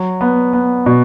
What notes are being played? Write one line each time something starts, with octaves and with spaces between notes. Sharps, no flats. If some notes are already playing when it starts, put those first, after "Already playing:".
Already playing: F#3
B3
B3
B2